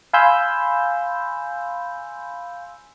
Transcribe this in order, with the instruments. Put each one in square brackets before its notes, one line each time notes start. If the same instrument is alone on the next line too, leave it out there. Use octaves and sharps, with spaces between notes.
[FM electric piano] F5 G#5 B5 C6 E6 G6